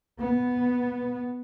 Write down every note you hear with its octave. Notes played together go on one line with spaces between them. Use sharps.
B3